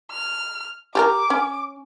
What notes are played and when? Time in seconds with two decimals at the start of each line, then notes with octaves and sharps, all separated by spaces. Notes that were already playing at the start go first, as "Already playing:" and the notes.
0.11 F6
0.95 G4 G#4 A#4 D6
1.30 C#4